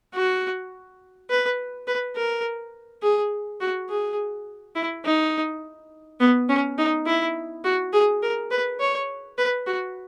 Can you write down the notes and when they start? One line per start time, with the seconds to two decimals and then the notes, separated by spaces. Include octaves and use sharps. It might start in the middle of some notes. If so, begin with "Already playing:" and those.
0.14 F#4
1.30 B4
1.87 B4
2.16 A#4
3.02 G#4
3.61 F#4
3.89 G#4
4.76 E4
5.05 D#4
6.20 B3
6.49 C#4
6.78 D#4
7.07 E4
7.64 F#4
7.93 G#4
8.23 A#4
8.51 B4
8.80 C#5
9.38 B4
9.67 F#4